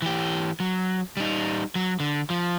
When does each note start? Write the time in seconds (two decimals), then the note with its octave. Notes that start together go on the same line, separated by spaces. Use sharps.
0.02 E3 G4
0.60 F#3
1.17 G3 D#4
1.75 F#3
2.00 D3
2.30 F3